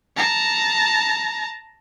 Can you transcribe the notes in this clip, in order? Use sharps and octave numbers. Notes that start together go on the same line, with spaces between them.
A5 A#5